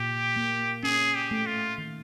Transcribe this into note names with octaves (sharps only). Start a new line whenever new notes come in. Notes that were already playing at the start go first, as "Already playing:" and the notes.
Already playing: A#2 G4
A#3
C#4 G#4
G4
A3
F4
D#3